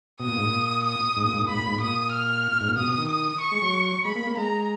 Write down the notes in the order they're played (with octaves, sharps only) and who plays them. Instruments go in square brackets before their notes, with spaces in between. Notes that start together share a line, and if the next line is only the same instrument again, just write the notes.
[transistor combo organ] B2 [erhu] D#6
[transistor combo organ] A#2
G#2
A#2
[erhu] D#6
[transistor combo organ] G#2
A#2
G#2
A#2
[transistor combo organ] G#2 [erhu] B5
[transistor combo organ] A#2
G#2
[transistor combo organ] A#2 [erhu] D#6
[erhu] F6
[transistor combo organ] G#2
A#2
[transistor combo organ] B2 [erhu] D#6
[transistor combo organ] B2
D#3
[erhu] D#6
C#6
[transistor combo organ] G#3
F#3
[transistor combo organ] G#3 [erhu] B5
[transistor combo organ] A#3
A#3
[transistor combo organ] G#3 [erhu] A#5